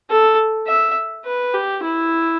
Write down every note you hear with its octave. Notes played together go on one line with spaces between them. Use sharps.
A4
E5
B4
G4
E4